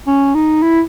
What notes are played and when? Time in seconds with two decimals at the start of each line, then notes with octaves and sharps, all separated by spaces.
0.07 C#4
0.35 D#4
0.63 E4